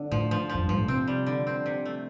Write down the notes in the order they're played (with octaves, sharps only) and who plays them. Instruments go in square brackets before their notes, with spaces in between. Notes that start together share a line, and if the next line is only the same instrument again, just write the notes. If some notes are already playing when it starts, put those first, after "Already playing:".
Already playing: [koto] D3
[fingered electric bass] A2 [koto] F3
[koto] F3
[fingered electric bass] F2 [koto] F3
[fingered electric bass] G2 [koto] F3
[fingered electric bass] A2
[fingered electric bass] C3 [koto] C4
[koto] G3
D3
C4
C3
A3